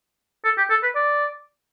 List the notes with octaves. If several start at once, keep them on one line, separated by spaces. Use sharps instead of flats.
A4
G4
A4
B4
D5